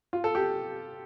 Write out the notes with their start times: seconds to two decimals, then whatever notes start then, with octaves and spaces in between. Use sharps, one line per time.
0.13 F4
0.24 A4
0.35 G4